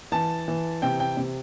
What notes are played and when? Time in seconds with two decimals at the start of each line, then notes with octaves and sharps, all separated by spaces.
0.12 E3 A5
0.48 E3
0.82 C3 G5
1.00 G5
1.17 C3